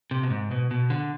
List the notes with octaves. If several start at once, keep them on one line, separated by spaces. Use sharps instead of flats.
C3
B2
G#2
B2
B2
D3